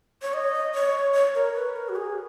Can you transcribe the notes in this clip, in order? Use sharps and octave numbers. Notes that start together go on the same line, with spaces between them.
C#5
D#5
C#5
C#5
A#4
B4
A#4
F#4
G#4